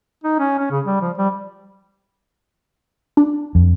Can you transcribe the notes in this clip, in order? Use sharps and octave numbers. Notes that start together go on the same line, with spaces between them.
D#4
C#4
C#4
C#3
G3
F3
G3
D4
F2